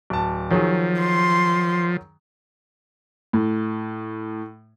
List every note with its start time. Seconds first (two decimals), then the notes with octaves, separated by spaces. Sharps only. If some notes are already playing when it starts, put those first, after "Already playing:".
0.10 D1 A5
0.50 D#3 F3 F#3 G#4
1.00 C6
3.33 A2